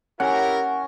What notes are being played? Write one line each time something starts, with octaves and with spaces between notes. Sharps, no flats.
C#4 E4 G4 A#4 F#5